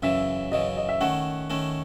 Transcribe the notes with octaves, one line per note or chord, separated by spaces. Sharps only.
F#2 C#3 E3 E5
F#2 C#3 E3 D#5
D#5
E5
D#3 A3 C#4 F#5
D#3 A3 C#4